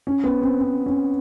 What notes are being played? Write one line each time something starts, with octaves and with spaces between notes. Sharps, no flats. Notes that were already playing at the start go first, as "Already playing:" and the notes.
C#4
B3
C4
C4
C#4